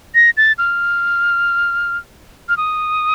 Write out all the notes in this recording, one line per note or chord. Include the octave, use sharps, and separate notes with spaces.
A#6
A6
F6
F6
D#6